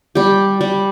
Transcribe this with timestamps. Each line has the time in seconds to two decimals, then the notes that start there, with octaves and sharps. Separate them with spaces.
0.15 G3 G4
0.61 G3